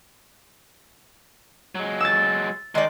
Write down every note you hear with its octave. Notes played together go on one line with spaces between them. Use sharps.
F#3 G#3
E6 A6
D#3 G#3 D5